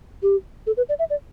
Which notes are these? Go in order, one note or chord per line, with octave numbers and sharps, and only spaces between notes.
G4
A4
B4
D5
E5
D5